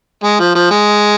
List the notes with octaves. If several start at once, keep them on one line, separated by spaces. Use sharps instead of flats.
G#3
F3
F3
G#3